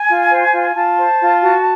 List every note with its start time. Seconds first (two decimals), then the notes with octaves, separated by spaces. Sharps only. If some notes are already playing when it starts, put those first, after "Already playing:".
Already playing: G#5
0.08 F4
0.31 C5
0.53 F4
0.75 F4 A5
0.97 C5
1.20 F4
1.42 F#4